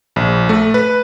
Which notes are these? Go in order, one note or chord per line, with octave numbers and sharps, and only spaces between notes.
A#1
A3
B4